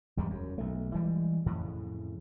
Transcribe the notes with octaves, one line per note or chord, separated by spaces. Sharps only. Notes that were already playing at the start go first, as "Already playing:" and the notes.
G#1 E2 G3 G#3
F#2
B1 A3
E3 G3 G#3
F2 A2 C#3